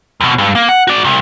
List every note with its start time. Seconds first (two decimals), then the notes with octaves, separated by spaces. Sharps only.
0.21 D#2 B2
0.38 G2
0.55 A#3
0.69 F#5
0.87 F#4 D5
1.04 C2